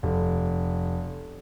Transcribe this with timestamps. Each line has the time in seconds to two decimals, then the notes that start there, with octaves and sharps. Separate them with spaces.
0.03 F1